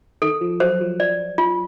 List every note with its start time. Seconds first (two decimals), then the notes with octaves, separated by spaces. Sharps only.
0.22 D#3 A4
0.41 F3
0.60 F#3 C5
0.81 F3
0.99 F3 D5
1.38 F4